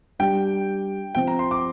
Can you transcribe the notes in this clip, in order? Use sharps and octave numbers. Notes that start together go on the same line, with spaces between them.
G3 D4 G4 G5
F3 C4 F4 G5
A#5
C6
D6